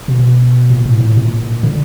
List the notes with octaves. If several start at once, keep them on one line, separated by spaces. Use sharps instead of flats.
B2
A#2
A2
A2
A#2
D3